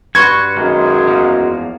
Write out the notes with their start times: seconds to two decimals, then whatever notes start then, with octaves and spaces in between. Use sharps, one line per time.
0.15 G2 F#4 B4 C6 C#6 G#6
0.57 F#2 D#3 F#3 G#3 A#3
1.07 E2 F3 A#3